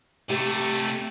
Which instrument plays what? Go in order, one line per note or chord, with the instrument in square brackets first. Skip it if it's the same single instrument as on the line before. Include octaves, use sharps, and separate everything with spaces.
[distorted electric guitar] C3 A3 [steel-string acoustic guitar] G4